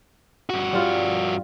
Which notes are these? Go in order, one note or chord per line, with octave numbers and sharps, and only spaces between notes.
G2 F#4
G3 F4